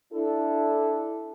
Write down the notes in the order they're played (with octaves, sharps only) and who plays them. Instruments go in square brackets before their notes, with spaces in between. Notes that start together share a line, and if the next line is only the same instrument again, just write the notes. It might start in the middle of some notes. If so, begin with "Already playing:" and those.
[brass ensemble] D4 E4 A4